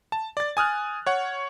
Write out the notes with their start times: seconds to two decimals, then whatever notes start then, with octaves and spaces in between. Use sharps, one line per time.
0.12 A5
0.37 D5 A6
0.57 G#5 D#6 F6 F#6
1.06 C#5 F#5